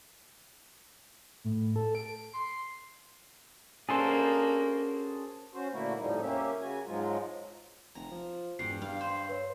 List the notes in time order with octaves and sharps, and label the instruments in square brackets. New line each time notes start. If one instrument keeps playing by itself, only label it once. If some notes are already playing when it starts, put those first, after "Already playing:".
[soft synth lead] A2
A4
D7
C6
[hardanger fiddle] A#3 [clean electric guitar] C#4 D4 F#4 [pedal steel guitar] G#4 A4 C5
[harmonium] C#4 F#4 C5
A#2 D3 A3 A#3 E4 F#4
F2 A2 F3 G3 D#4
A#3 C#4 G4 E5
C#3 F#4 G#5
G#2 F3 F#3 G#3 F4
[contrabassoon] F1 [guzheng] A#5
[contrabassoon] F3
[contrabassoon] E1 [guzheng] G2 [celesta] C7
[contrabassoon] G2 [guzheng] F5
[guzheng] C5
[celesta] B4 C#5